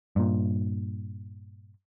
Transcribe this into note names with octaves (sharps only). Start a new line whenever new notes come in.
G2 A#2